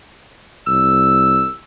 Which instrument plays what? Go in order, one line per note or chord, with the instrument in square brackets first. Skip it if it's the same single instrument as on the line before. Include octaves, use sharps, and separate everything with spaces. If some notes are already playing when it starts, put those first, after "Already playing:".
[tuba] C2 [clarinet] E6